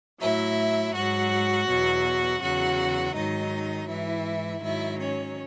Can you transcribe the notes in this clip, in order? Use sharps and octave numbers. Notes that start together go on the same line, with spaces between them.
A2 F#3 E4 E5
G#2 F#3 F#4 F#5
E2 B2 F#3
E2 C#3 F#3 F#4 F#5
G#2 D#3 F#3 D#4 D#5
G#2 E3 E4 E5
G#2 D#3 F#3 E4 E5
C#4 C#5